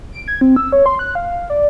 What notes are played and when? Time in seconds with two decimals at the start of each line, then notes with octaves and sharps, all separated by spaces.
0.12 D7
0.28 G#6
0.41 C4
0.56 E6
0.72 C#5
0.86 C6
0.99 F#6
1.15 F5
1.50 D5